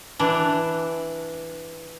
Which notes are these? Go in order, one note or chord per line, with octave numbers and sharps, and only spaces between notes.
E3 D4